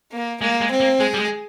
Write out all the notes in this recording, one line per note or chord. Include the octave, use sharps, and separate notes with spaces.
A#3
G#3 A#3
G#3
C4
A#3
G#3 G#4
G3
G#3